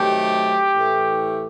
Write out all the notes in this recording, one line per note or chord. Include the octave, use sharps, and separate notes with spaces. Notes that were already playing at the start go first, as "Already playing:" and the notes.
Already playing: C3 D#3 F#3 A3 G4
A2 E3 A3